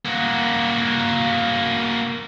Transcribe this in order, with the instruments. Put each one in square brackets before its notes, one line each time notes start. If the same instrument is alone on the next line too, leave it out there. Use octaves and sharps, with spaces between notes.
[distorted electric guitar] A#3 F#4